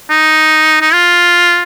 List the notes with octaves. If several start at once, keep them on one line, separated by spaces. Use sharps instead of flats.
D#4
D#4
F4